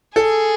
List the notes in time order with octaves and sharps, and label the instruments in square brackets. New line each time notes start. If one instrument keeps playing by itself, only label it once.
[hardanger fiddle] G#4 [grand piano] A4